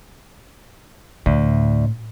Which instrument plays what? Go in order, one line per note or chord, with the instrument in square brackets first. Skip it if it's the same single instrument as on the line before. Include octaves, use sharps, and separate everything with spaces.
[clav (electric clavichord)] D2 [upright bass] A2